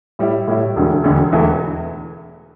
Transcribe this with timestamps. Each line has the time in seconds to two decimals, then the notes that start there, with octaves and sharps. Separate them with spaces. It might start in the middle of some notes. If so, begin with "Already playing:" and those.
0.19 A2 G3 E4
0.48 A2 G3 E4
0.76 E1 D2 D3
1.04 E1 D2 D3
1.32 E1 E2 E3 A3 E4